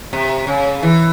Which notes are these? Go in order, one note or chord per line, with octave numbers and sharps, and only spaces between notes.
C3
C#3
E3